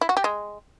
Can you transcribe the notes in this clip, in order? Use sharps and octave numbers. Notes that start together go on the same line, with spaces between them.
E4
F#4
G4
G#3